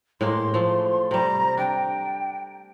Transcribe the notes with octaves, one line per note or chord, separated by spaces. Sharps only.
A2 G#3 A#3 C6
F3 A3
C3 G3 A#5
D4 G5